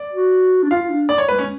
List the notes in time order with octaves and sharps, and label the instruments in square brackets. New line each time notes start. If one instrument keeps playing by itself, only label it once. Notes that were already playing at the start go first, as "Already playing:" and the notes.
Already playing: [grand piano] D5
[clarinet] F#4
D4
[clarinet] F4 [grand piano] F5
[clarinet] F4
D4
[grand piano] D5
C#5
[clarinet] G#3 [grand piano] B4
[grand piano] C#4